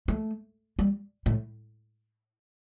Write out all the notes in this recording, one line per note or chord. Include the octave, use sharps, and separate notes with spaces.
A3
G3
A2